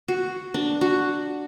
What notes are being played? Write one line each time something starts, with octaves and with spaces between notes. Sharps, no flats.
F#4
D4
F#4